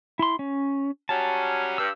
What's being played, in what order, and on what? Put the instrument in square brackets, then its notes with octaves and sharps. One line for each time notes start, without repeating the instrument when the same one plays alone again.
[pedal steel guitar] E4 C6
C#4
[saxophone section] F#3 G3 C#4 [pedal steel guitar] A5
[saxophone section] G2 [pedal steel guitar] E6